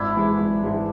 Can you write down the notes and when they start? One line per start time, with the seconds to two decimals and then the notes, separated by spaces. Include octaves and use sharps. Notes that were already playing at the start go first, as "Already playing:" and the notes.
Already playing: G#1 D4 E4
0.16 G#2 E3 G#3
0.39 G#1
0.63 G#2 E3 G#3